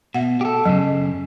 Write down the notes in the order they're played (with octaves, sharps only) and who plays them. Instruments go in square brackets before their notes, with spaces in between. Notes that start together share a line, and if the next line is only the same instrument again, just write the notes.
[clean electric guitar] B2 [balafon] E5 F#5
[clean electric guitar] G4 A4
[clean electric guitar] F#2 C#3 [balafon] F#3